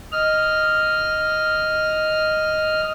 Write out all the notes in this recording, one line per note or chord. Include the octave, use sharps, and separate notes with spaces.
D#5 F6